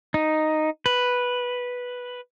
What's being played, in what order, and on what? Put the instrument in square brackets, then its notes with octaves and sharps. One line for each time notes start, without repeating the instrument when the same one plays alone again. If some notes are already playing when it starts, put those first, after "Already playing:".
[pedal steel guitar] D#4
B4